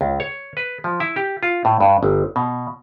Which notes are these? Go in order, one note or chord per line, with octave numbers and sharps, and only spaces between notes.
C#2
C#5
B4
F3
E4
G4
F4
A2
G2
G1
B2